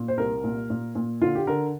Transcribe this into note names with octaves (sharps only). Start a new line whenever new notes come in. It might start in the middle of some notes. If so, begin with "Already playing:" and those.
Already playing: A#2
C5
C2 A#4
A#2
A#2
A#2
D3 F4
G4
D3 A#4